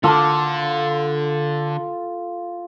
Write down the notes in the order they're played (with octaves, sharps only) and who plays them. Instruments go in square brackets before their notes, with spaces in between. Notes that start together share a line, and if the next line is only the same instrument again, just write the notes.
[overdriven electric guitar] D3 [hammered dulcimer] F4 A4 D6